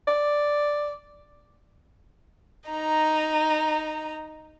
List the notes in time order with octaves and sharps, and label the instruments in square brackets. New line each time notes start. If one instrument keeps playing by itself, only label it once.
[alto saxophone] D5
[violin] D#4 A#5